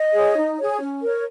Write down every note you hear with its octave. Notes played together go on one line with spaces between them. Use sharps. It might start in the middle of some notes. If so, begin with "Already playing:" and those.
Already playing: D#5
G#4 C#5
D#4
G#4 C#5
C#4
A#4 C#5